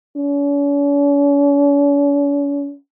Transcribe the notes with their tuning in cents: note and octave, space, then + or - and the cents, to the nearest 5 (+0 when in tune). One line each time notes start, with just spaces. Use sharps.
C#4 +45